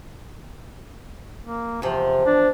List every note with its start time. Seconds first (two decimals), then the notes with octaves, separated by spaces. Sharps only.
1.44 A#3
1.82 E2 C3 F3
2.26 D4